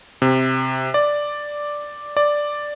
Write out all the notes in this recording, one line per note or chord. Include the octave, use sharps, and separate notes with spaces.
C3
D5
D5